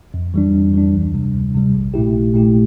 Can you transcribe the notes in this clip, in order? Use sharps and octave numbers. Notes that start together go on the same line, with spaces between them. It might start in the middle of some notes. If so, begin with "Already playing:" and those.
F2
E3 G3 D4
F2
E3 G3 D4
D2
C3 G3
D2
C3 G3
A#1
A#2 A3 E4 G4
A#1
A#2 A3 E4 G4